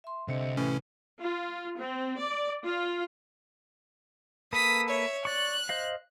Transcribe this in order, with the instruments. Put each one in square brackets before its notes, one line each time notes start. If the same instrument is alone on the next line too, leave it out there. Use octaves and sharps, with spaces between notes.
[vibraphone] E5 C6
[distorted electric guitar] C2 [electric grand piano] D3 C4 C#7 [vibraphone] C5 D#5 E5
[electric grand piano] A2 E3 [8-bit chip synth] C#4 [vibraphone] B4
[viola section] F4
C4
D5
F4
[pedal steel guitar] A#3 A4 B4 [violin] D#6 B6
[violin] C#5 E5
[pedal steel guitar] D5 C#6 [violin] F#6
[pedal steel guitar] C5 D#5 F5